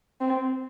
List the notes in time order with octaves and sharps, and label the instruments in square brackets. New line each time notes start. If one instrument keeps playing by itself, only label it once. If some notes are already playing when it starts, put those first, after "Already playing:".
[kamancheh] C4